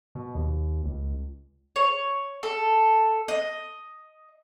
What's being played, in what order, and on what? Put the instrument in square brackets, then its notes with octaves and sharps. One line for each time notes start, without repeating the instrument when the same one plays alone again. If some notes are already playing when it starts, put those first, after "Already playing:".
[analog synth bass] B2
D#2
C#2
[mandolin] C#5
A4
D#5